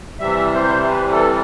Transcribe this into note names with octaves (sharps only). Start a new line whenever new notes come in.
C3 E3 G3 E5
C5
B4
A4